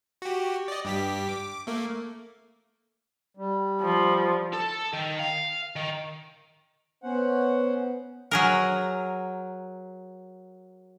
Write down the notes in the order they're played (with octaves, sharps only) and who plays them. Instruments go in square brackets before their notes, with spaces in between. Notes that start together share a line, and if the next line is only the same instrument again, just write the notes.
[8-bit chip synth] F#4 G4
D5 D#5
G2 G4 B6
D6
A3 A#3
[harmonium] G3
[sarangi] F3
[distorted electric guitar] A4
D#3
F5
D#3
[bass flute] B3 [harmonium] C#4 C5 F#5
[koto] F#3 G#4 A#4